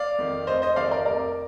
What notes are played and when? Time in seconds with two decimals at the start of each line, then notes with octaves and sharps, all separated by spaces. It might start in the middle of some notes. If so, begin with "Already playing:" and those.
Already playing: D5 F5
0.18 F2 D#3
0.47 F1 C5 D#5
0.62 C5 D#5
0.76 F2 D#3 D5 F5
0.91 A#4 D5
1.06 F1 A#4 D5